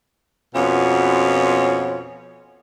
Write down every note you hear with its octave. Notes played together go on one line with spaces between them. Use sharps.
F2 B2 B3 C#4 F4